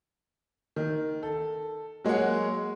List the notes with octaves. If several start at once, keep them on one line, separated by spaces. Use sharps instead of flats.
D#3
A4
F#3 G#3 A#3 C#5 F#5